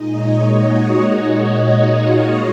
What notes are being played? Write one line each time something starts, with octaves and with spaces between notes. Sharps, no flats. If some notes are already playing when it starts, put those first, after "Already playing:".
Already playing: A#2 G#3 D#4 D#5
C#5
F#4
D#4
F4
F4